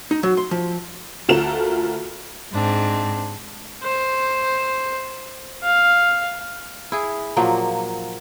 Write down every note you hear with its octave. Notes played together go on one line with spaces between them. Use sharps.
D#4
F#3
C6
F3
D2 F4 F#4 A4 A#4 E7
G#2 C4 D4
C5
F5
E4 G#4
A#2 F3 F#3 A#3